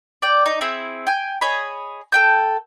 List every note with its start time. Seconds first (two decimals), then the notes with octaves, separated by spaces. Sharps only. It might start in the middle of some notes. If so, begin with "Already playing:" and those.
0.22 D5 G5
0.46 D#4
0.61 C4 E4 G#4
1.07 G5 G#5
1.41 G#4 C#5 D#5 B5
2.12 A4 G5 G6